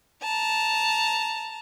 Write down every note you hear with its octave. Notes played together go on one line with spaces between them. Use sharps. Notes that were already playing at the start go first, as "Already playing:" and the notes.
A5 A#5